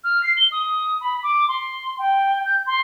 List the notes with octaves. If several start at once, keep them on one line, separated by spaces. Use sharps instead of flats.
F6
C7
G7
D#6
B5
D6
C6
G5
G6
C6